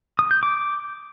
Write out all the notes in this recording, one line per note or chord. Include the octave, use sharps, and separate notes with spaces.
D#6
G6
D6